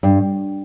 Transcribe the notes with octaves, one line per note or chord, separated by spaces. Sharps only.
G2